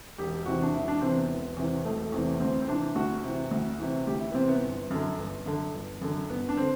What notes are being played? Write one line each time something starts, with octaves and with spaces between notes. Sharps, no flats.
E1 G4
E2 C3 E3 F#4
D4
E1 E4
D4
E2 C3 E3 C4
B3
E1
E2 C3 E3
E1 A3
E2 C3 E3
D2 C4
C4
C3 E3 D4
D2 F#4
C3 E3
D2
C3 E3
D2 G4
E4
B3
C3 E3 C4
B3
G1
F#2 D3
G1
F#2 D3
G1
F#2 D3
G1 B3
D4
D3 C4